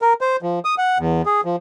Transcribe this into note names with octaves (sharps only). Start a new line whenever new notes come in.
A#4
C5
F3
D#6
F#5
E2
G#4
F3